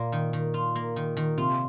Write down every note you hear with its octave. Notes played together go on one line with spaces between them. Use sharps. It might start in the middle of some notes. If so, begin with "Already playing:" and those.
Already playing: A#2 A#3 F4
D#3
D#3
F4
A#3
D#3
D#3
C3 F4